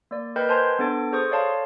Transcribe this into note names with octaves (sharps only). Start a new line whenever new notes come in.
A#3 D5
A#4 B4 D#5 G5 B5 G6
C5 G#5 A5 C6
B3 D4 A4 A6 D7
G#4 A4 C5 C#6 D#6
A4 C#5 D5 F5 A5 C6